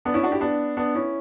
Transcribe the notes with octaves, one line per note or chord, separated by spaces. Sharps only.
B3 D4
C#4 E4
D4 F#4
E4 G4
B3 D4
B3 D4
C#4 E4